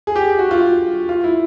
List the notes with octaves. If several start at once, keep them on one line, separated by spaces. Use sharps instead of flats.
G#4
G4
F#4
F4
F4
E4